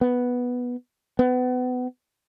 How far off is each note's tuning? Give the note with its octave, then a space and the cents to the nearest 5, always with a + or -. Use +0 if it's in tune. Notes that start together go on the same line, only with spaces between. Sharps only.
B3 -5
B3 +30